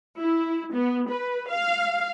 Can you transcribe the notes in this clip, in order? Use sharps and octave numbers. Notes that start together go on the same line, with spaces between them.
E4
B3
B4
F5